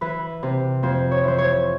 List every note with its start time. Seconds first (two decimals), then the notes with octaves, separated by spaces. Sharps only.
0.01 E3 B4
0.43 C3
0.83 F2 C5
1.11 C#5
1.24 E3 C5
1.38 C#5